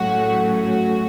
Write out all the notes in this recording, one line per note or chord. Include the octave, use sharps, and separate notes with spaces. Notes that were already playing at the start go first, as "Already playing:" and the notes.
Already playing: A2 F#3 A3 C#4 F#4
F#4